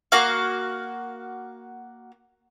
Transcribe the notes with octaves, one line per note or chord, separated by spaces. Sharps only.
A#3 F#4 F5